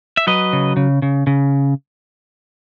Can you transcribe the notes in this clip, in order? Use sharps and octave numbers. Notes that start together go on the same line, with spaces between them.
E5
F#3 B4 D#5
C#3
C#3
C#3
C#3